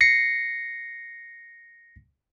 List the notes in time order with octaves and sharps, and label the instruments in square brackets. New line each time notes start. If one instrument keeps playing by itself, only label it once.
[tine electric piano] A#6 C7 C#7